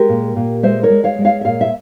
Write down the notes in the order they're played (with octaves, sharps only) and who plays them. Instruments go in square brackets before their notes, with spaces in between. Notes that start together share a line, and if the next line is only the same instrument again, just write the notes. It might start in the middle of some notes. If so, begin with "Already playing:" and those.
Already playing: [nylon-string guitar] G#3 G4 A#4
A#2
A#2
G#3 C5 E5
A#4 C#5
G#3
C#5 F5
G#3
C#5 F5
E5
A#2 C#5 F5
E5